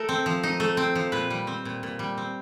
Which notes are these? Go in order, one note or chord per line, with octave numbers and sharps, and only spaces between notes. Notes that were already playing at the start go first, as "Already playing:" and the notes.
Already playing: A3 A#4
C4
F3
D#4
A3
C4
F3
A#2 B4
G3
C4
A#2
A#2
G3
C4